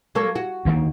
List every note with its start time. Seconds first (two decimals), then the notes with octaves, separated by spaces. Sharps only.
0.15 F#3 A#3 A4
0.36 F#4
0.65 D2 D#3 A#3